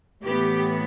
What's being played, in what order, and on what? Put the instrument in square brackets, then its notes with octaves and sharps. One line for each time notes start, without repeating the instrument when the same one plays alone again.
[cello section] A2 E3 B3 G4